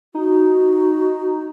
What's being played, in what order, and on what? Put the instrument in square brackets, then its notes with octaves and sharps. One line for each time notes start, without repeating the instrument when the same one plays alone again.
[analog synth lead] D#4 [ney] F#4